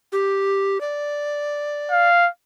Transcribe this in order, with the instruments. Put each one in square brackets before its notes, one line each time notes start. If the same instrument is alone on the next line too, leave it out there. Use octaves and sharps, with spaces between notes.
[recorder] G4
D5
[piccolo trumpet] F5